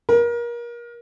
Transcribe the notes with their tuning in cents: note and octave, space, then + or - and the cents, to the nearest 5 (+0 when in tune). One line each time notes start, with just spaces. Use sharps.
A#4 +30